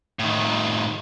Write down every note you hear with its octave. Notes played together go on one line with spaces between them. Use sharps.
A2 D#3